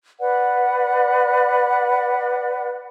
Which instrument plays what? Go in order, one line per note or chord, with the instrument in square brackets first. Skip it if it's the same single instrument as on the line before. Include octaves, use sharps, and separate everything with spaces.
[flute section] B4 D5 F#5